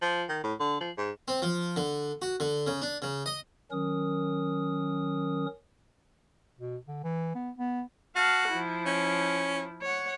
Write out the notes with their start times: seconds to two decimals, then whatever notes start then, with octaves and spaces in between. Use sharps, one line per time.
0.02 F3
0.29 D#3
0.43 A2
0.60 D3
0.81 F3
0.98 G#2
1.28 C4
1.42 F3
1.77 D3
2.22 F#4
2.40 D3
2.67 C#3
2.82 D4
3.02 C#3
3.26 D#5
3.71 D#3 F#3 C#4 A#4 D#6
6.59 B2
6.87 D3
7.04 E3
7.35 B3
7.59 B3
8.16 F#4 F5 A5
8.49 F3 E4
8.86 C#4
9.82 C#5 F#5